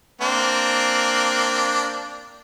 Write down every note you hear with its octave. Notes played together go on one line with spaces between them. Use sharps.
A#3 C4 D4